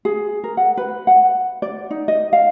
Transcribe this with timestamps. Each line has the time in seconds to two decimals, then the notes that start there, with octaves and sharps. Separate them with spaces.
0.05 G#4
0.44 A#4
0.57 F#5
0.77 B4
1.07 F#5
1.62 D5
1.91 D#4
2.08 D#5
2.33 F5